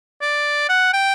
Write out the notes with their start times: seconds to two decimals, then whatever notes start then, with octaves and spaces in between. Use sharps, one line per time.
0.22 D5
0.69 F#5
0.94 G5